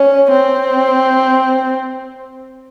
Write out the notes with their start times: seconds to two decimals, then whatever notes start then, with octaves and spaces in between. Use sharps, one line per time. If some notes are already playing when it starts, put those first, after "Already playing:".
Already playing: C#4
0.32 C4